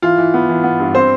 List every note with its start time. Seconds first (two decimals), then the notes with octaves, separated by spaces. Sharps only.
0.02 E3 F4
0.18 E3
0.34 B3
0.49 E3
0.64 B3
0.80 G2
0.95 C4 C5